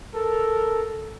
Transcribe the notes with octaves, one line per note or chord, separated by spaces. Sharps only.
A4 A#4